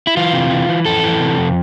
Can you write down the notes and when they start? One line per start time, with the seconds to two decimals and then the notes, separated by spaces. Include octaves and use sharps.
0.07 E4
0.17 E3 F4
0.33 C3
0.51 E3
0.69 E3
0.85 F2 A4
1.03 E3
1.20 C3
1.38 F2